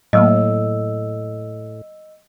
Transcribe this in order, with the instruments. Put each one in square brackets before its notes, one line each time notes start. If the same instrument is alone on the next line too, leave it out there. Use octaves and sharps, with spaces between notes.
[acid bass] A2 [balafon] F#3 A3 A#3 [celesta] D#5 E6